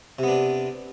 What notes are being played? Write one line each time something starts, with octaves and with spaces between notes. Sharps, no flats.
C3 B3 D4